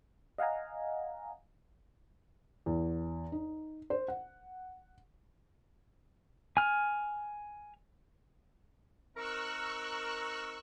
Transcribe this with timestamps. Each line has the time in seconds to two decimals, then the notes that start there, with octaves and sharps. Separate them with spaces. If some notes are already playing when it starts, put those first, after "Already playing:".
0.38 D#5 F5 F#5 G#5 A#5
2.66 E2
3.32 D#4
3.90 C5
4.08 F#5
6.57 G#5 F6
9.16 C4 D#4 A#4 C#6 E6 F#6